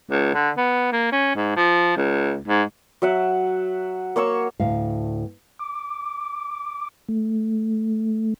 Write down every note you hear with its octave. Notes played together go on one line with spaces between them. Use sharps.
C#2
D3
B3
A#3
C#4
G#2
F3
C#2
G#2
F#3 E5 F#5
A#3 C#5 C#6 E6
D2 A2 F5
D6
A3